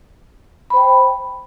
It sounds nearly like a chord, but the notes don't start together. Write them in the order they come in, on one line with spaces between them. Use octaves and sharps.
B5 C5 G5